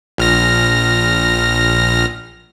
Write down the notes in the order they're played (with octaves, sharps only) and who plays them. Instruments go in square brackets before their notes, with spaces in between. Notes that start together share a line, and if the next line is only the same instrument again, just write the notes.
[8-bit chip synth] A#1 F6 A#6